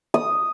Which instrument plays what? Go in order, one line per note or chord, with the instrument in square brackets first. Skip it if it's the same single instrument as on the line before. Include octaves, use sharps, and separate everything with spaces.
[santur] D#6